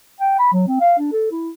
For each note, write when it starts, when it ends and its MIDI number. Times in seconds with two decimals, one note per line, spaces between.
0.20 0.36 79
0.39 0.49 83
0.52 0.65 54
0.68 0.77 60
0.80 0.94 77
0.99 1.11 62
1.12 1.30 69
1.31 1.50 64